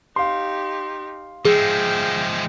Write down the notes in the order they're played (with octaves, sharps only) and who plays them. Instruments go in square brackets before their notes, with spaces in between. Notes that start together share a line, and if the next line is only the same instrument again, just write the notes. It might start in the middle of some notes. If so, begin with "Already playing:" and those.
[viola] D#4 G4 [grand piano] F5 C6
[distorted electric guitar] F3 G#3 [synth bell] G#4 [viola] E5 G5